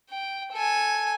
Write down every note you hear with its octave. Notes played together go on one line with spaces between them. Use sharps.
G5
A4 G#5